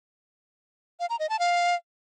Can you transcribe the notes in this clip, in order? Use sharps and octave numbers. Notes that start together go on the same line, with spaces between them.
F5
A#5
D#5
A5
F5